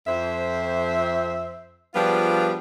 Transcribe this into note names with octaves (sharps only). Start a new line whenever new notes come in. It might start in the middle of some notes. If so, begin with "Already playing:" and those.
F2 C5 E5
F3 G3 B3 D4 F4 G#4